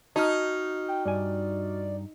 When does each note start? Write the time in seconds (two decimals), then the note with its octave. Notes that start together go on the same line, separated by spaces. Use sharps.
0.16 D#4 F#4 A5 F6
0.88 G5
1.05 G2 D5 G#5